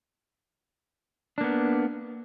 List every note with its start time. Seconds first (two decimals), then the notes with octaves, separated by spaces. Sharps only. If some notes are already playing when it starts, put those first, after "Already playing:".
1.38 D4
1.41 A#3
1.44 B3